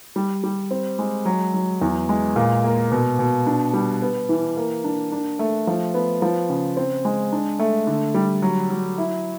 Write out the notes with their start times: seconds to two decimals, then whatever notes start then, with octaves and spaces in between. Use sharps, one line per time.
0.16 G3
0.44 G3
0.71 C4
0.99 G#3
1.25 F#3
1.54 F#3
1.81 E2
2.09 G#3
2.36 A#2
2.64 A#3
2.92 B2
3.19 B2
3.47 D4
3.74 G3
4.02 B3
4.29 E3
4.57 A#3
4.84 D4
5.12 D4
5.39 A3
5.67 F3
5.94 B3
6.22 F3
6.49 C#3
6.77 C4
7.05 G#3
7.32 D4
7.59 A3
7.87 D3
8.14 G3
8.42 F#3
8.70 F#3
8.98 E4